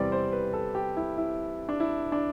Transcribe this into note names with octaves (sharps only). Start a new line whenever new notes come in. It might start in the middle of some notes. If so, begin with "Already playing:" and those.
Already playing: E2 C3 E3 G3 C4 D5
C5
B4
A4
G4
E4
E4
D4
E4
D4